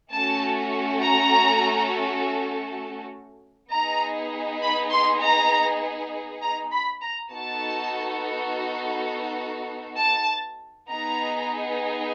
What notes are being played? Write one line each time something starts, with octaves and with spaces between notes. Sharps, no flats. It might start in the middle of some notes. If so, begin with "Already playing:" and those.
A3 C#4 F#4 A4 A5
A#5
B3 D#4 G#4 A#5
B5
C6
A#5
A#5
B5
A#5
B3 D#4 F#4 A4 A5
A5
B3 D#4 G#4 A#5